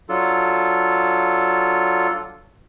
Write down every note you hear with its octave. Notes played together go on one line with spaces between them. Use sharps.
F#3 D4 F4 A4